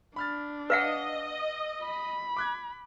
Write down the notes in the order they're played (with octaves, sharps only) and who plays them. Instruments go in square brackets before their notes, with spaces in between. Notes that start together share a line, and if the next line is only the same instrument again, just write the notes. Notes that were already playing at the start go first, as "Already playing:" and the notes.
[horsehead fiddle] D4 [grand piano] B5 F6 A6
[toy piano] B4 F5 F#5 [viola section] D#5 [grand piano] E6 C#7
[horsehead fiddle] B5
[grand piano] D6 F#6 G#6